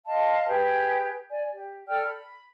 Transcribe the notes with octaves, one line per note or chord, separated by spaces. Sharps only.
D#5 F5 A5 C6
G4 G#4 B4
D5 G#5
G4
A4 D5 G5 F6
B5